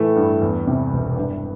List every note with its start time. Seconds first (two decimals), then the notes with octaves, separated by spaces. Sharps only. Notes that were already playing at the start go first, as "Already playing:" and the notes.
Already playing: A2 E3 A3
0.16 G2
0.41 E2
0.67 C3
0.92 E1
1.17 G2